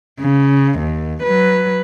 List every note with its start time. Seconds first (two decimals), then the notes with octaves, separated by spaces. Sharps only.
0.20 C#3
0.79 D#2
1.23 F#3 B4